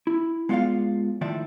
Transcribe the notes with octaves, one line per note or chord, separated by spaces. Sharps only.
E4
G#3 B3 F4 C#5 D5 F5
A2 D#3 F3 D5 E5